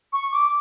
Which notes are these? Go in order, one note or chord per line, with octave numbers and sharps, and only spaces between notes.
C#6
D6